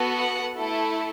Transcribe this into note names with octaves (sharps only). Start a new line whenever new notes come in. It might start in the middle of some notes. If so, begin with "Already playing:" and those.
Already playing: B3 F#4 A4
F#5
A3 E4 A4